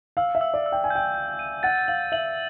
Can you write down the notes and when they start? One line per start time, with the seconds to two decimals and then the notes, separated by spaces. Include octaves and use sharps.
0.17 F5 E6
0.35 E5
0.41 E6
0.54 D5
0.66 E6
0.72 G5
0.84 G#5
0.90 G5 G6
1.15 G6
1.39 D#7
1.63 F#5 A6
1.88 F5 F#7
2.12 E5 F#7